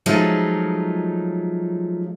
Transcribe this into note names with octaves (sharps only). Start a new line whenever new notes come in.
F3 F#3 G#3 A3 D#4 F4